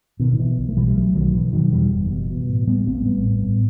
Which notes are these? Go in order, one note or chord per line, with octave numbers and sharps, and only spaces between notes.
B2 D#3
D#3
B2 E3
B1
A3
B2 E3 G3
G3
B1 F#3 A3
B2 D#3 F#3
B2 E3
B2 D#3 F#3
E2 E3 G3
F#1
B2
B2
A2
A2 G3 B3
A1 A3 C4
A1 G3 B3
A2
A2